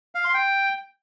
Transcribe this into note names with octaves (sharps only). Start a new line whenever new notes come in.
F5
C6
G5